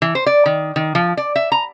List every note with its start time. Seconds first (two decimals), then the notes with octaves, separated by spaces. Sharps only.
0.02 E3
0.15 C5
0.26 D5
0.46 D#3
0.76 D#3
0.95 F3
1.17 D5
1.36 E5
1.52 A#5